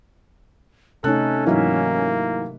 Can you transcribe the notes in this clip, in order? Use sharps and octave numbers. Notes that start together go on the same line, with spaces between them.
C3 A3 C#4 D#4 A4 F#6
G#2 E3 F#3 A#3 A#4 E5